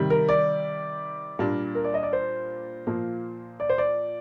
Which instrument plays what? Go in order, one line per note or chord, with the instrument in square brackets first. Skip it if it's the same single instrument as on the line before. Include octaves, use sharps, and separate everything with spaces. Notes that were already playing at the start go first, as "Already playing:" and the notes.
Already playing: [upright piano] C3 D#3 G3
[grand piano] A#4
D5
[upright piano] A#2 G3 A#3 D4
[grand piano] A#4
D5
D#5
D5
C5
[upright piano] A#2 F3 A#3
[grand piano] D5
C5
D5